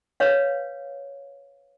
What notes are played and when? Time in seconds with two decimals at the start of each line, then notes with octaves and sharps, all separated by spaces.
0.20 B4 C#5 F5